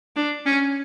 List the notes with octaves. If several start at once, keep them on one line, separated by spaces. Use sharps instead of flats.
D4
C#4